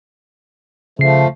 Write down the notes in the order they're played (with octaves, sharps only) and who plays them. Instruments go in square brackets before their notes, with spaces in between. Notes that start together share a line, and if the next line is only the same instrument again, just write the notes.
[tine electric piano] C#3 C7 [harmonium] F3 A3